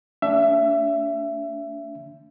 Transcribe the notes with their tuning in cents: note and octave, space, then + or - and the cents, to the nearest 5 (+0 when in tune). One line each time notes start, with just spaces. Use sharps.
A3 +40 D4 -35 E5 +25